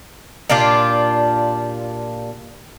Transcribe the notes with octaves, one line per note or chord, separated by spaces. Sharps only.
A#2 D4 F4 G4